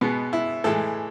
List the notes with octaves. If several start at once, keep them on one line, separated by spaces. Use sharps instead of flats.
B2 G#3 B3
E4
A2 E3 G#3 A4